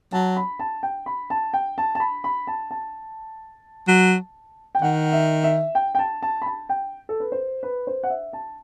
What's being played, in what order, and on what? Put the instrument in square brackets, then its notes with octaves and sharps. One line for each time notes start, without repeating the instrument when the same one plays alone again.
[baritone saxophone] F#3 [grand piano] A5
[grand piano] B5
A5
G5
B5
A5
G5
A5
A5
B5
B5
A5
A5
[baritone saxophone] F#3
[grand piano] G5
[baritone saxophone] D#3 [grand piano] F#5
[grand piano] E5
E5
G5
G5
A5
A5
B5
A5
G5
A4
B4
C5
B4
C5
F#5
E5
A5